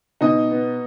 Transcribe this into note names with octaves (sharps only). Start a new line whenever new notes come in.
B2 D#4 D#5
B3